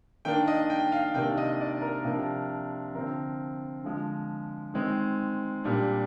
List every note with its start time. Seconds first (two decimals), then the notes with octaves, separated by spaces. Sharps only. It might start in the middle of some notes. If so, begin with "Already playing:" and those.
0.25 D#3 A#3 D4 G5
0.47 D#5
0.70 G5
0.92 F5
1.14 C3 D#3 A#3 D4 G5
1.37 D#5
1.60 D5
1.82 A#4
2.05 C3 F3 A#3 D4
2.94 D3 F3 C4 A#4
3.84 D3 F3 G#3
4.74 D#3 G#3 C4
5.64 A#2 G3 D4